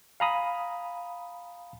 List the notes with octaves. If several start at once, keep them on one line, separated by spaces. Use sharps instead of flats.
F5 G#5 A#5 B5 D#6